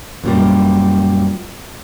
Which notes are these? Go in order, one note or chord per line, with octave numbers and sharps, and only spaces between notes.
F#2 A#2 G3